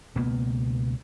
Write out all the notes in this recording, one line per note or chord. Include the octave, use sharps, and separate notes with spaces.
C#2 B2 A#3 B3